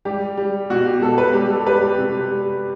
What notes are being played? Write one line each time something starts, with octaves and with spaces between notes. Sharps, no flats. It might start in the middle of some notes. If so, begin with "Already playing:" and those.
G3 G4
G3
B2 F#4
G4
B2 A4
B4
G3 G4
A4
G3 B4
G4
C3
G3